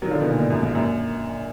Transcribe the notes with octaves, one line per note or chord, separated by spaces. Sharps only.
D#3 F#3
D3 F3
B2 D#3
A#2 D3
G#2
F#2
G#2
F#2 A#2